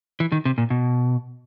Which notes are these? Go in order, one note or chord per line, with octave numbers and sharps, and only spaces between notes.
E3
D#3
C3
A#2
B2